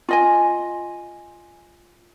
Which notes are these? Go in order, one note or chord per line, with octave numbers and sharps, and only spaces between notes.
F4 D#5 G#5